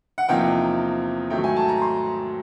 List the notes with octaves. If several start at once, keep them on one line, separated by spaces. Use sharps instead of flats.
F#5
E2 C3 F3 A#3 D#4 G5
G#2 D#3 F#3 A3 G5
G#5
A5
A#5
C6